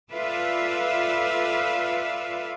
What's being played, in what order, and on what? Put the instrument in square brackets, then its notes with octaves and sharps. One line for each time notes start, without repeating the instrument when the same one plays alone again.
[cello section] F4 A4 B4 D5 E5 F5